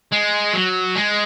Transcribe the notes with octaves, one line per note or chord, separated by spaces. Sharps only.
G#3
F#3
G#3